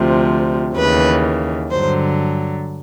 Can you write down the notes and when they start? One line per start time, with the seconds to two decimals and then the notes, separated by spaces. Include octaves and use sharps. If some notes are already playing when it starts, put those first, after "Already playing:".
Already playing: D2 C3 F3
0.76 D#2 C#3 E3 B4
1.71 G2 D3 F#3 C5